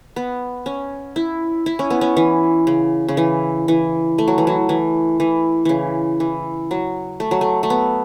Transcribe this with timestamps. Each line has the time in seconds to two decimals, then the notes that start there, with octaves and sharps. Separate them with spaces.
0.16 B3
0.66 C#4
1.16 E4
1.66 E4
1.79 C#4
1.90 B3
2.01 C#4
2.17 E3
2.67 C#3
3.08 C#3
3.17 E3
3.68 E3
4.18 A3
4.28 F#3
4.38 E3
4.47 F#3
4.69 E3
5.20 E3
5.65 C#3 E3
6.20 E3
6.71 F#3
7.20 A3
7.31 F#3
7.41 A3
7.63 A3
7.70 B3